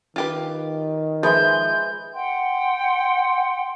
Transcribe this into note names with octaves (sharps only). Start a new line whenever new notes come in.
D#3 F4 G4 B4
F3 G#3 B4 E5 G6
F#5 G5 C6